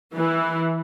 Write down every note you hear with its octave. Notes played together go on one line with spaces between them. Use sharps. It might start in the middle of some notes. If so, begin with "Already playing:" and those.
E3